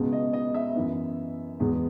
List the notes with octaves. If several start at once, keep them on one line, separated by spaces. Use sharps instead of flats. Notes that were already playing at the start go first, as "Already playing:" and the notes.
Already playing: C#2 B2 G#3 B3
D#5
D#5
E5
F#2 E3 B3
E2 B2 G#3 B3